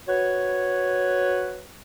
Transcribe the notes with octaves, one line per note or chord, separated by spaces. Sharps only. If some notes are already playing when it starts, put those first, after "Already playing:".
F#4 B4 C#5